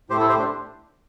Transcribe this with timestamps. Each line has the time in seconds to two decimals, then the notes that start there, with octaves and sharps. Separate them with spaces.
0.10 A2 A3 G4 C5
0.19 E4 A4
0.29 G4 C5
0.39 D4